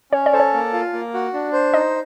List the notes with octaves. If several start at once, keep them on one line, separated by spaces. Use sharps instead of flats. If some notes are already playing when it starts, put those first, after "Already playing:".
C#4 C#5
D5
A4 C5
C#5
A#3
F4
A#3
F#4
D4
C5
D#4 D#5